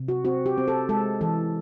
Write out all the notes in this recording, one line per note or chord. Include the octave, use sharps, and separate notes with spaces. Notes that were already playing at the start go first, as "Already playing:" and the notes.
Already playing: C3
F#4
C4 F#4
G4
C4
A4
G#3 A4
E3 A4